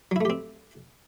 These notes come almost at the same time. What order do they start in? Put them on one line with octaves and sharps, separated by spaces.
F#3 E4 A3 G4 C4